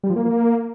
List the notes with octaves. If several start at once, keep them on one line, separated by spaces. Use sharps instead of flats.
G3
F3
A#3